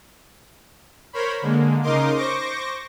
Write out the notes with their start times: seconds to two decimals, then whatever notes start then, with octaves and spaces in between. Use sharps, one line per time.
1.13 A#4 C5 C#5 B5
1.42 D3 G#3 A#3
1.82 C#3 D#4 A#4 D#5 C6 D6
2.16 C5 C#6 D6 A#6